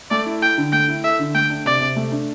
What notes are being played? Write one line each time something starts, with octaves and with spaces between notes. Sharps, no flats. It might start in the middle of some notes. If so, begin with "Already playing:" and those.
A3 D5
E4
A4 G5
D3
A3 G5
E4
A4 E5
D3
A3 G5
D4
C3 D5
C3
A3
D4